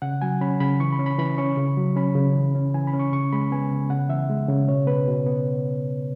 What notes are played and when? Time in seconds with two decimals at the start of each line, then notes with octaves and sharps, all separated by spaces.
0.02 C#3 F#5
0.21 F#3 G#5
0.41 C#4 B5
0.60 C#3 B5
0.80 E3 C#6
0.92 B5
0.99 C#4
1.06 B5
1.18 E3 B5
1.38 C#4 C#6
1.57 C#3
1.77 F#3
1.96 C#4 B5
2.15 C#3
2.36 E3
2.55 C#4
2.74 E3 G#5
2.87 B5
2.93 C#4
2.99 C#6
3.12 C#3 C#6
3.32 G#3 B5
3.52 B3 G#5
3.71 C#3
3.90 C#3 F#5
4.09 E3 E5
4.30 G#3
4.49 C#3
4.68 B2 C#5
4.87 B3 B4
5.08 B2
5.26 B3